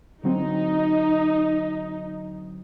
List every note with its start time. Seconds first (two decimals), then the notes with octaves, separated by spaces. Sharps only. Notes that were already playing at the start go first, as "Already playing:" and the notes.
0.24 D3 F#3 C4 D#4